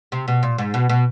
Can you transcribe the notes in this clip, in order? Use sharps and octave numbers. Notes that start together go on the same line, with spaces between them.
C3
B2
A#2
G#2
B2
B2